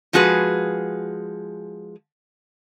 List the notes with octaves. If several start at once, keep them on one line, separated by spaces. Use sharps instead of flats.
F3 G#3 F#4 G#4 B4